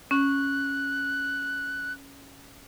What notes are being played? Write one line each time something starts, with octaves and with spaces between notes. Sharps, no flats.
C#4 F#6